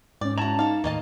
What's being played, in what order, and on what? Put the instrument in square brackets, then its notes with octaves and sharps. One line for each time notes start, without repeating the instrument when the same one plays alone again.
[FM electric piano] G#2 C#4 [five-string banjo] D5
[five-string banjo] E4 F#4 [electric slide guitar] A5 A#5
[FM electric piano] D#4 [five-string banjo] A4 F5
[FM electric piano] D#2 A2 [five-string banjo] A#3 D#5 A5